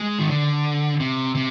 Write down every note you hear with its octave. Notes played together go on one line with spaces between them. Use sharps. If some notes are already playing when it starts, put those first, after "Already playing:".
Already playing: G#3
D#3
D3
C3
C3